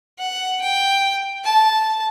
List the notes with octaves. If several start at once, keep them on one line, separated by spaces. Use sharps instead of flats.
F#5
G5
A5